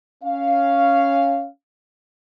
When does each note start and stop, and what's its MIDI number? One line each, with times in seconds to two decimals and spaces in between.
0.24 1.48 61
0.24 1.48 77